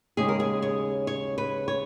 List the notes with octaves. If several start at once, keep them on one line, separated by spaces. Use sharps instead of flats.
D#2 C#3 G#3 G#4
A#4
G#4
C#5
C#5
B4
C#5